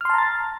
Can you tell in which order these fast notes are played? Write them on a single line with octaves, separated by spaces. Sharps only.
F6 C6 A5 A#5 A6